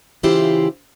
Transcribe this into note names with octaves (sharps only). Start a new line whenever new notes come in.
C#3 E3 E4 F4 G4 C5